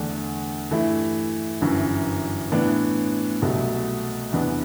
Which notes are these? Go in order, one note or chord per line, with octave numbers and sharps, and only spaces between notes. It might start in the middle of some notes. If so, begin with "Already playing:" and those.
Already playing: E2 D3 A3 D4
G2 E3 A3 E4
G1 F#2 E3
A2 E3 B3 D4
C2 B2 F#3 A3
E2 C3 E3 B3 D4